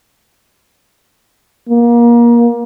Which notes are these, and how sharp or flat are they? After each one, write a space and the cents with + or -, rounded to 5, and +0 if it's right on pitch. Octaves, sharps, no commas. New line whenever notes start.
A#3 +25